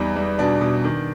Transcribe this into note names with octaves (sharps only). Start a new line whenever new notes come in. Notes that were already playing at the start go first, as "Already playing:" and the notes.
Already playing: E2 G3 D#4
G3
B2 D4
B2
D#3